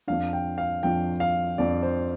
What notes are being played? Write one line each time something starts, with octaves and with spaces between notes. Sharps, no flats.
F2 F3 D4 F5
G5
F5
F2 F3 D4 G5
F5
F2 F3 D4 D5
C5